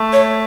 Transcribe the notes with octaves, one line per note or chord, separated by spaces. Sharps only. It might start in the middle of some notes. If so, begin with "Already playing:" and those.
Already playing: A3
C#5